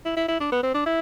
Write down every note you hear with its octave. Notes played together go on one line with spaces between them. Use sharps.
E4
E4
E4
D4
B3
C4
D4
E4